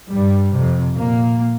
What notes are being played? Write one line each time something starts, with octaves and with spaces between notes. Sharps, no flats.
G2 G3
C3
F2
A#2 A#3